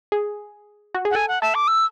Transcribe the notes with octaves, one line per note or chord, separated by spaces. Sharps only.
G#4
F#4
G#4
F#5
A4 G#5
F#5
A4 E5
D6
E6